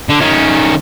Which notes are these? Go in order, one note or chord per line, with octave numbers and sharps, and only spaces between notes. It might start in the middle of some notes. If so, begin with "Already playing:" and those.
D3
D#3 C#4